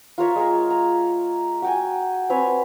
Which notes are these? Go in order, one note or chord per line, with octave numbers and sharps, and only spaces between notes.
F4 A#4 C#5 E5
G#3 A#4
A#5
F#4 G5 G#5
C4 B4 C#5 G#5